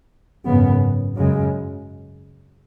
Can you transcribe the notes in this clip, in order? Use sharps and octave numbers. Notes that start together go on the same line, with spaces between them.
G#1 F#2 C#3 B3
F#2 C#3 G#3